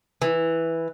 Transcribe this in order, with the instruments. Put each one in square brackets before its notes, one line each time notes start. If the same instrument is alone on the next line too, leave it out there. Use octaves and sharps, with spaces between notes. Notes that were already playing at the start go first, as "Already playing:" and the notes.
[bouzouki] E3